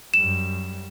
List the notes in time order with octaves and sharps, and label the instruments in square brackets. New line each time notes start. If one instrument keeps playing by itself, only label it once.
[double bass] F#2 G3 [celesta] E7